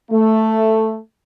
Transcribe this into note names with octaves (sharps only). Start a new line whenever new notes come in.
A3